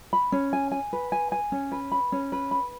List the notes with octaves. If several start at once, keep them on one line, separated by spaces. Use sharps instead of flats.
B5
C#4
G#5
G#5
B4
G#5
G#5
C#4
B4
B5
C#4
B4
B5